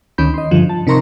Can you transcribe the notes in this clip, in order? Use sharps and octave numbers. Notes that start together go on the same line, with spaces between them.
D2 D#3 C#4 B5 G6
D#5 C6
G2 D3 F3
A5
C3 D#4 A#4 A#5 C6 C#6